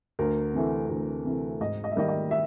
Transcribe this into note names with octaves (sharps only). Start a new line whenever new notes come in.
D2 A#4
C3 E3 A3
D2
C3 E3 A3
G#2 D#5
D#5
E5
D#3 G3 A#3 D#5
D#5
E5